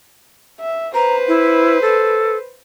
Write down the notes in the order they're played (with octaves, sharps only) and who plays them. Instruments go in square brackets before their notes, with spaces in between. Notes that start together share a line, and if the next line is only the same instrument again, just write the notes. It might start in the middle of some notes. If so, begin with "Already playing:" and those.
[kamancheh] E5
[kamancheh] B4 C5 [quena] A#5
[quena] E4
A4